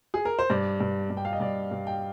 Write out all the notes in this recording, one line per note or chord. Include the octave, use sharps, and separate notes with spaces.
G#4
A#4
C5
G2 D5
G2
G2
G5
F5
D#5
G2 D5
G2
G5